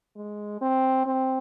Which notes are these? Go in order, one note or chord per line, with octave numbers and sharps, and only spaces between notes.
G#3
C4
C4